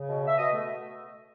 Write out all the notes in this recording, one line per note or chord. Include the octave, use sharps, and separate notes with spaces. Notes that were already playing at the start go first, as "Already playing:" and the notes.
Already playing: C#3
B2
B2 E5
B2 D#5
A3